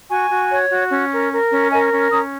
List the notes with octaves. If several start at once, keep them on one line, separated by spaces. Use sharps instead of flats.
F#4 G#5 C#6
F#4
C#5
F#4
C#4
A#4
A#4
C#4
A#4 D#5 G#5
C#4
C#4 A#5 D#6